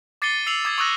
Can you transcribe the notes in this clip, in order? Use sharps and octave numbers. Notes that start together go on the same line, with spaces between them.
D6 A6 C7 C#7 D#7 G7
E6 C7 C#7 F7 F#7
D6 D#6 G#6 A6 C7
C#6 D#6 E6 F#6 A#6